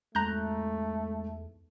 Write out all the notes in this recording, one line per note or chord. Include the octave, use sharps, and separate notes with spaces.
G#1 E2 A3 A#5 F#6 G6